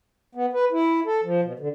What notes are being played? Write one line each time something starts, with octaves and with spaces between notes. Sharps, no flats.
B3
B4
E4
A4
F3
B2
D3